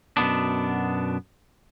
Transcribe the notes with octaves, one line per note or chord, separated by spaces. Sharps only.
F#2 B2 B3 D4